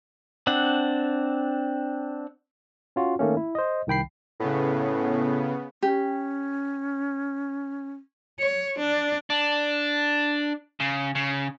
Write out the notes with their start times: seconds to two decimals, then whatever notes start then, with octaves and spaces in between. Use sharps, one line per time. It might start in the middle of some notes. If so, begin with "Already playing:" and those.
0.47 C4 D4 F#5
2.96 C#4 F4 F#4
3.19 D#3 A3 A#3 C#4
3.37 E4
3.55 C5 D#5
3.87 C2 D#3 G5 B5 C7
4.40 A2 C#3 B3
5.83 C#4 G4
8.39 C#5
8.79 D4
9.30 D4
10.80 C#3
11.15 C#3